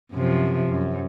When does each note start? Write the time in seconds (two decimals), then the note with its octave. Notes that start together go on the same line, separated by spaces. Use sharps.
0.12 F#2 C3 F3
0.68 F#2